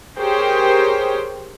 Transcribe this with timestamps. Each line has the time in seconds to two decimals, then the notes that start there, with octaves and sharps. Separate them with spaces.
0.18 G4 G#4 A#4 C5 C#5 G5